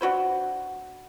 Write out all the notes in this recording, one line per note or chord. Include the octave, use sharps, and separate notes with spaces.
D4 F#4 B4 C5